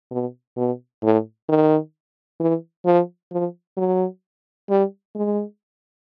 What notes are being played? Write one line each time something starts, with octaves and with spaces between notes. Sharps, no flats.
B2
B2
A2
D#3
E3
F3
F3
F#3
G3
G#3